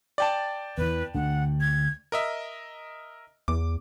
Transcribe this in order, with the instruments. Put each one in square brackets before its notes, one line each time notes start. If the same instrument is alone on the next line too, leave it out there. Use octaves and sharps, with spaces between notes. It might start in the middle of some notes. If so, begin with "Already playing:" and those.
[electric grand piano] D5 G5 A5
[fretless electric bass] E2 E3 [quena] B4
[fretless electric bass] D2 D3 [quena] F#5
[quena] G#6
[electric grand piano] A#4 D#5 E5
[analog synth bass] E2 [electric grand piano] D6